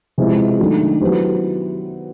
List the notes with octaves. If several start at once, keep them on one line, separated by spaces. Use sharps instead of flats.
C3 F3 G#3 B3 E4
D#3 F#3 A3 D4 F#4
F#3 B3 E4 G4 C5